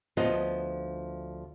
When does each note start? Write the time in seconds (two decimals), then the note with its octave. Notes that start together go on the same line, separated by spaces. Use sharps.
0.17 D2 F3 B3 F4 D#5